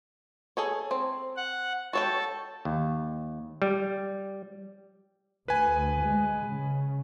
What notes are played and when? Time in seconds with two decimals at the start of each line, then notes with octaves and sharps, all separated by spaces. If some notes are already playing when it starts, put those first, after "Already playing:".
0.57 G#4 A4 C#5
0.91 C4
1.36 F#5
1.93 F#4 A4 C#5 G5 A5
2.65 D#2
3.62 G3
5.48 D2 B4 G#5
6.03 G#3
6.47 C#3